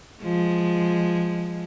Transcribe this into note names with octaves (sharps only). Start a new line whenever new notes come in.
F3 G#3